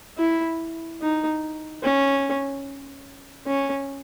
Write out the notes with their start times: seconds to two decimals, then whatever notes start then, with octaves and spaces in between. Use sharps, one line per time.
0.18 E4
1.01 D#4
1.83 C#4
3.47 C#4